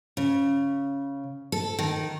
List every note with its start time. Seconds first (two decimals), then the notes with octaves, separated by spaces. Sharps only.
0.17 C#3
1.52 A4
1.79 D#3